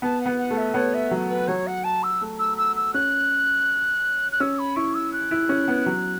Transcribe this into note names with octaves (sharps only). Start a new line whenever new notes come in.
B3 A5
F#5
B3
F#5
A3
E5
B3 C#5
E5
F#3
B4
F#3 C#5
F#5
A5
E6
A3
E6
E6
E6
C#4 F#6
F#6
C#4 E6
B5
E4 C#6
E6
F#6
E4
C#4
B3
F#3